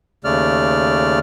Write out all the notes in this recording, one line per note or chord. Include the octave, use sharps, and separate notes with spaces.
D#2 C#3 A3 D5 F6